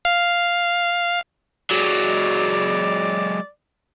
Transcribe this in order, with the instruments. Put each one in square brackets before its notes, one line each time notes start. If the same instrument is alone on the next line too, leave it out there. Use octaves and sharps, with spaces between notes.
[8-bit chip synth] F5
[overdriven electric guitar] F#3 G#3 [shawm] D5